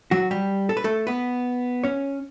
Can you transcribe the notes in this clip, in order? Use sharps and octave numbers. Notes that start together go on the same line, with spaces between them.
F#3 F#4
G3 G4
A4
B4
A3 A4
B3 B4
C#4 C#5